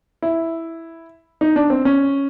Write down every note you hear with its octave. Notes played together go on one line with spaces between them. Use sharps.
E4
D#4
D4
C4
C#4